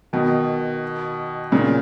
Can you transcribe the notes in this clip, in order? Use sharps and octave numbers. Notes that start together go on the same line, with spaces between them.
B2 D#3
A#2 C#3